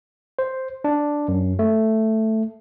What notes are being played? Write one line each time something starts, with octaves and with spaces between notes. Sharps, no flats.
C5
D4
F#2
A3